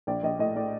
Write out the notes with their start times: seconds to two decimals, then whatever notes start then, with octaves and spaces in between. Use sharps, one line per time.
0.07 A#1 D5
0.23 A#1 D#5
0.39 A2 D#5
0.56 A2 D5